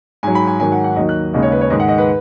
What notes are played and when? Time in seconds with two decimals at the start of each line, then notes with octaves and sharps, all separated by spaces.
0.23 G#2 F#3 G#5
0.35 B5
0.47 G#5
0.60 G#2 D#3 F#3 G#5
0.72 F#5
0.84 F#5
0.96 D#2 D#3 F#3 D#5
1.09 F#6
1.33 D#2 C#3 G#3 D#5
1.43 C#5
1.52 B4
1.61 C#5
1.70 G#2 D#3 G#3 D#5
1.80 F#5
1.89 D#5
1.98 B4